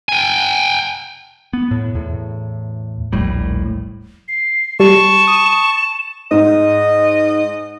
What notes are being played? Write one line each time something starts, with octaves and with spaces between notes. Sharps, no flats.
G5 G#5
B3
A2
E2 A2
D#1 A#1 A2 G3
C7
G3 A5 C#6 E7
D#6
G#2 D#5